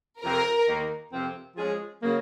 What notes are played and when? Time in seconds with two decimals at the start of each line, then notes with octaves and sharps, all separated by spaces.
0.22 F2 C3 F3 C4 A#4
0.67 D#2 D#3 A#3
1.12 F2 C3 F3 C4
1.56 F3 G#3 C#4 G#4
2.02 C#3 F#3 A#3